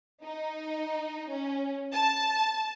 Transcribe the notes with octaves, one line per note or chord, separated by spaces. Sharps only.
D#4
C#4
A5